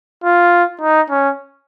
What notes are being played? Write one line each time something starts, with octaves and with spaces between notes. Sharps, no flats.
F4
D#4
C#4